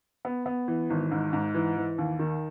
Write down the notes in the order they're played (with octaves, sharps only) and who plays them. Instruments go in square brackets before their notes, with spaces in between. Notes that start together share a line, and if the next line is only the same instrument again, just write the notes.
[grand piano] B3
B3
E3
G#1
G#2
G#2
E3
E3
D#2
D#3